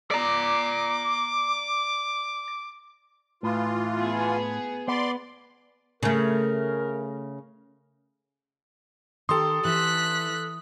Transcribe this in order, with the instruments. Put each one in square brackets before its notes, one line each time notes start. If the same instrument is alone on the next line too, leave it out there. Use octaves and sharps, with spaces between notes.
[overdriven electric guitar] D5 A#5 [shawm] D6
[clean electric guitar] A2 [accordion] E3 F4
[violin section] B3 G#4
[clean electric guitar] B3 [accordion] D5 C6
[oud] C#3 A3 [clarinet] A#4
[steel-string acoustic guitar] D#3 G4 [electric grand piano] A4 C6 [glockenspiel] D#6
[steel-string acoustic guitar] E3 [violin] F#6 B6